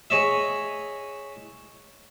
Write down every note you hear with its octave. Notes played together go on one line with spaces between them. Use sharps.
G#4 C#5 D#5 E5